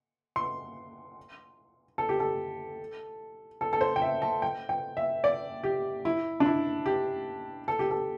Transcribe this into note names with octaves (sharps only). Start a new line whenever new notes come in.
C6
A4
G4
A4
A4
A4
C5
G5
E5
A5
G5
G5
E5
D5
G4
E4
D4
E4
G4
A4
G4
A4